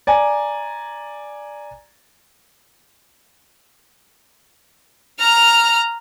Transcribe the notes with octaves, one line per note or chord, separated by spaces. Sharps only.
D5 G#5 A#5
A#5 F6